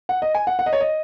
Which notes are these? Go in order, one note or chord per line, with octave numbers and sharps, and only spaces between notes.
F#5
D#5
G#5
F#5
F#5
D#5
C#5
D#5